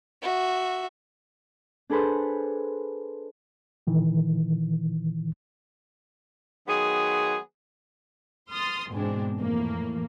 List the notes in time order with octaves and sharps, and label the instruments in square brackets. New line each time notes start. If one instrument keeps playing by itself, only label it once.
[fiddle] F#4 E5
[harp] D4 G#4 A4 B4 C5
[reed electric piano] A#2 D#3 E3
[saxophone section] D#3 F#3 G#3 B3 G#4
[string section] C6 D#6 F6 A6
E2 G#2 B2 G#3 C4 D4
F2 A2 E3 A#3